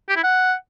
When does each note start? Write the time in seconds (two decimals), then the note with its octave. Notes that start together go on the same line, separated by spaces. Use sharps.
0.09 G4
0.16 E4
0.23 F#5